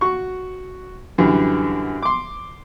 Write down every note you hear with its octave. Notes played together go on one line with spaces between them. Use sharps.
F#4 C#6
F#2 D3 E3 G3
C6 D6